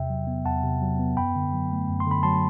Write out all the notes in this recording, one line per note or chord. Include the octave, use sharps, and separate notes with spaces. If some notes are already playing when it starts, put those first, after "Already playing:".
Already playing: E2 C3 E5 G5
F#3
B3
E2 F#5 A5
C3
F#3
B3
F#2 G5 B5
D3
F#3
A3
F#2
C6
D3 B5
F#3 A5 C6